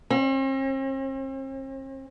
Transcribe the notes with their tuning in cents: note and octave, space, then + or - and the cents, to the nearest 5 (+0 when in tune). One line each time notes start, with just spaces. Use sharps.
C4 +45